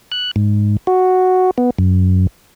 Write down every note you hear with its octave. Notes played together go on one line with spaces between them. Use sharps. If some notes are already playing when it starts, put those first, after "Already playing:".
F#6
G#2
F#4
B3
F#2